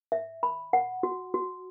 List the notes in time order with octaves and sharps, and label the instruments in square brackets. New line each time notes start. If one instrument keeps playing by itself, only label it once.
[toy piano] E5
B5
F#5
F#4
F#4